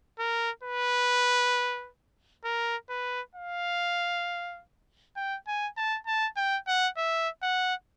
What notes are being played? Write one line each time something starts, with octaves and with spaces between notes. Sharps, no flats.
A#4
B4
A#4
B4
F5
G5
G#5
A5
A5
G5
F#5
E5
F#5